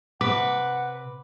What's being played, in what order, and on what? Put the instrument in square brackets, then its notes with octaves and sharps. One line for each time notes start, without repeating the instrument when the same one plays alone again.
[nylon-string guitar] C3 [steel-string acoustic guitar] B4 [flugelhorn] F#5 [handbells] D6